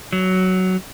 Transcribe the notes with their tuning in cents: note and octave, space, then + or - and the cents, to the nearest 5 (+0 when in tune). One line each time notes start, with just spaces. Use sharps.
F#3 +10